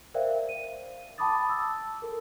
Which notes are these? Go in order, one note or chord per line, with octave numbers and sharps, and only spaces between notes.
A#4 C5 D5 E5 F5 G5
D#7
G5 A5 B5 D6 D#6 A6
E6
A4 A#4